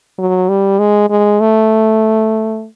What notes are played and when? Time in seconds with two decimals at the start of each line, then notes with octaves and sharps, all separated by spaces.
0.18 F#3
0.49 G3
0.79 G#3
1.10 G#3
1.40 A3